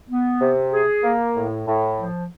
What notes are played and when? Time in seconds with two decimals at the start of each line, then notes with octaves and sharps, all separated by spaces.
0.10 B3
0.40 C3
0.73 G#4
1.04 A#3
1.36 A2
1.67 A2
1.98 F3